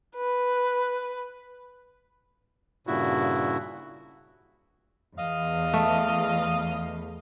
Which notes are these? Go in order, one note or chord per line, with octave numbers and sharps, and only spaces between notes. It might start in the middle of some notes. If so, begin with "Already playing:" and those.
B4
G2 A#2 C#3 E4 F#4
E2 D#5 F5
A3